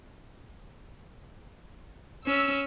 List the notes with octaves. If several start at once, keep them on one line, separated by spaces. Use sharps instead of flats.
C#4 E6